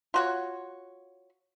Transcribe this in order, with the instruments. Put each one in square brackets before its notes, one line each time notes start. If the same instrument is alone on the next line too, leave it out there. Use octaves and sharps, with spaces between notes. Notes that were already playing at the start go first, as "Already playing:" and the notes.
[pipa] F4 F#4 C#5